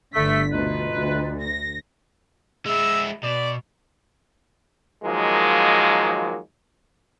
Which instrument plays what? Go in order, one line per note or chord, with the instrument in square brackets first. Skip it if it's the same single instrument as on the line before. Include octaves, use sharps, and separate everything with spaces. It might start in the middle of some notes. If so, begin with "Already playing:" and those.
[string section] G1 D3 B6 [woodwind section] A3
[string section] D2 B2 [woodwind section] D#4 F4 B4
[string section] D2
A#6
[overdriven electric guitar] G#3 E4 [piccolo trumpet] E6
[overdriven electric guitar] B2 [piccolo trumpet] D5
[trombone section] D#3 F3 F#3 G#3 A#3